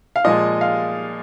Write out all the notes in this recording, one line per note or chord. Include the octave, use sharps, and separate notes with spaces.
F5
A#2 F3 G#3 D#5
F5